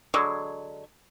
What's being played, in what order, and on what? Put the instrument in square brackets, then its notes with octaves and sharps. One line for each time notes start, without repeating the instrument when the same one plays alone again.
[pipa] D3 F#3 G#3